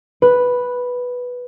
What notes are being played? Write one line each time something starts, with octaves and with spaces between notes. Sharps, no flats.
B4